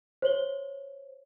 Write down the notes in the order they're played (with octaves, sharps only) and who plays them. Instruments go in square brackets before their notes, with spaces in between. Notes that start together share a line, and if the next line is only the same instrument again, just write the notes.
[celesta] C5 C#5 F#7 G7